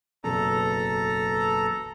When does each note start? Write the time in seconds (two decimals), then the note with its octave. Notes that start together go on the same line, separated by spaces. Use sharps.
0.24 F#1 B1 E2 A4 A#5